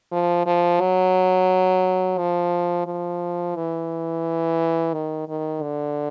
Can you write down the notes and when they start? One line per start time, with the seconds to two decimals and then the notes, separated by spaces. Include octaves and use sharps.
0.12 F3
0.46 F3
0.81 F#3
2.18 F3
2.87 F3
3.56 E3
4.94 D#3
5.28 D#3
5.62 D3